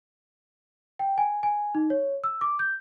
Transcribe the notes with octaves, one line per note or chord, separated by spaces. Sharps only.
G5
G#5
G#5
D#4
C#5
E6
D6
G6